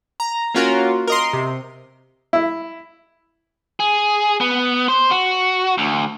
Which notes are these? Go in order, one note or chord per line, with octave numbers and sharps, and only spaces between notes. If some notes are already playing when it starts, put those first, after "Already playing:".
A#5
A#3 C#4 F4 F#4 A#4
A#4 D#5 C6
C3
E4
G#4
B3
C5
F#4
D2